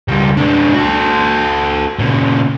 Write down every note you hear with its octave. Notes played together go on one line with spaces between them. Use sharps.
C#2 G3
G#3 D4
F#4 A4
A#2 C#3